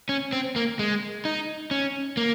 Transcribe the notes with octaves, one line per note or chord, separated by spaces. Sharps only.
C#4
C4
A#3
G#3
D#4
C#4
A#3